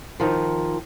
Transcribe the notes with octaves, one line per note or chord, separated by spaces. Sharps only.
D#3 F3